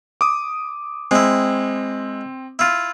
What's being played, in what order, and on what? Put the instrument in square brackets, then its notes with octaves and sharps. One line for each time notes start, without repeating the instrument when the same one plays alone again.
[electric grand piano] D6 D#6
[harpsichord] G#3 E4 [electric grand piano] C4
[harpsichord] E4 F4